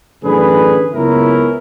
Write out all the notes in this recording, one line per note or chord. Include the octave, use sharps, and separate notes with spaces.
A1 F#2 D3 G#4 B4
F#1 C#2 B3 C#4 E4 A#4